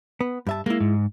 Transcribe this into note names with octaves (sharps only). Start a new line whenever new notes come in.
B3
G2 E5 A5
G#3 A#3 E4
G#2